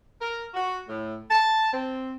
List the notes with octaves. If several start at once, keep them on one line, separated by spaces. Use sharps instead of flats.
A#4
F#4
A2
A5
C4